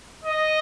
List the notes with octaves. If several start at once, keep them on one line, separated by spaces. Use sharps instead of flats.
D#5